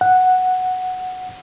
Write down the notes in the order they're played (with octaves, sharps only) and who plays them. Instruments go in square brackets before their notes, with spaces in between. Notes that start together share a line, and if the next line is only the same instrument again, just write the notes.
[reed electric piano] F#5